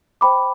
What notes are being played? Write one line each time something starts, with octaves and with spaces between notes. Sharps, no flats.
C5 G5 B5 D6